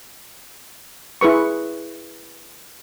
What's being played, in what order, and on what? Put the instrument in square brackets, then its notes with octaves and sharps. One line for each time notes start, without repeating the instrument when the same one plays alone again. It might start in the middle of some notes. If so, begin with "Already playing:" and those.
[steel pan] E4 G#4 B4 C#6